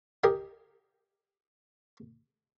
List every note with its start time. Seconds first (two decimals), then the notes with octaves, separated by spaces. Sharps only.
0.24 G4 A#4 D#5 G#5